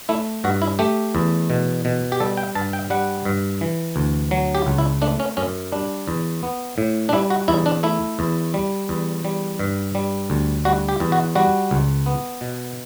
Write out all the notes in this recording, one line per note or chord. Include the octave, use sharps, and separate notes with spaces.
A3 E4
G2 F#4
E4
A3 G4
E2
B2
B2
G4
G3 A4
G5
G2 A5
G5
G3 F#5
G2
E3
D2
F#3
G4
C#2
E4
A3 D4
C#4
F#2 C#4
G3 D4
E2
B3
A2
D4
G3 E4
F#4
E2 E4
D4
A3 E4
E2
G3
E2
G3
G2
G3
D2
G3 F#4
G4
E2
F#4
G3 F#4
C#2
B3
B2